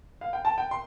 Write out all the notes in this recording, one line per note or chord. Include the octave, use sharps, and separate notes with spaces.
F5
G5
A5
G5
C6